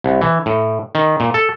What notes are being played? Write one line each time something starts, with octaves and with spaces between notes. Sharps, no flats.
C2
E3
A2
D#3
A#2
A4